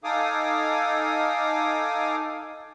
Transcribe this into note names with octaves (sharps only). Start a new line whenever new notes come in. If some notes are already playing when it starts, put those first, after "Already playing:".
D#4 A4 F5 G#5 D6 D#6